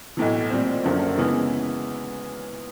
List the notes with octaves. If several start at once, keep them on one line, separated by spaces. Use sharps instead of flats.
B1 A2 E3
A#2 G3 C4
F#1 F#2 D3 F3 A#3
C#3 E3 G#3 B3